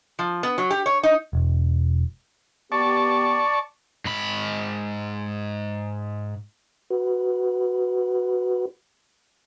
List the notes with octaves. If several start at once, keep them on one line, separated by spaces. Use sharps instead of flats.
F3
B3
F#3
G4
C#5
D#4
E1
B3 G4 D5 A5 C#6
G#2 B5
F#4 B4